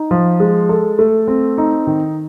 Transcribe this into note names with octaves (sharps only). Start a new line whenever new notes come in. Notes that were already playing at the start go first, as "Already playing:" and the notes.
Already playing: D#4
F3
G#3
A4
A3
C4
D#4
D#3